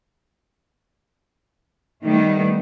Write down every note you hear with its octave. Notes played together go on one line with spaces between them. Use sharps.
D#3 G3 A3 B3